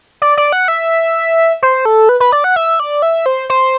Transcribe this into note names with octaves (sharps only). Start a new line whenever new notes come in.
D5
D5
F#5
E5
C5
A4
B4
B4
D5
F#5
E5
D5
E5
C5
C5